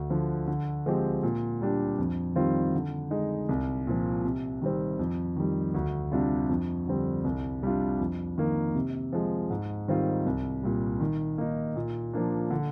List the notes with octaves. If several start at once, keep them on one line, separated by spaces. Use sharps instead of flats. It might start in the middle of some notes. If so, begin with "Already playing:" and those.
Already playing: D2
D3 F3
D3
F3 G#3 C4 G4
A#2
G3 D4 G4
F2
D#3 G3 C4 F4
D3
G#3 D#4
C2
A#2 F3
C3
D#3 G3 C4
F2
D#3 G3
D2
C3 G3 D4 F4
F2
D3 G3 C4
C2
C3 G3 D4 F4
F2
D#3 A#3
C3
F3 G#3
G#2
D#3 G3 C4 F4
C2
A#2 G3
D#3
A#3 D#4
A#2
F3 A#3 D4
D3